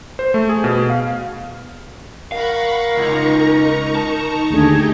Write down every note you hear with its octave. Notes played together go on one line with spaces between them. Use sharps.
C5
A3
G#4
B2
F5
A#4 F5 F#5 B5 C#6
C#2 D#4 A#5 C#6
A5
D#2 D3 A3 D#4 G4 G#4